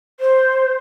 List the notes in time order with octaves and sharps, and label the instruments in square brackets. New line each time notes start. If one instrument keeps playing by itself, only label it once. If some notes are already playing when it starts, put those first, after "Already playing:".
[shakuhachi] C5